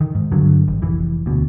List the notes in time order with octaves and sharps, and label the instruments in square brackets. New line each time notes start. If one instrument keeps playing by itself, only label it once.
[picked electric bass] D#3
G#2
G2 D3 F#3
A1
F1 E3
D2 B2